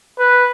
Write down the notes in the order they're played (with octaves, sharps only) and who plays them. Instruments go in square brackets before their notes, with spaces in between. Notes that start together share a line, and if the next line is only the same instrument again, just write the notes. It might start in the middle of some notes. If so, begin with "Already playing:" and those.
[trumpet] B4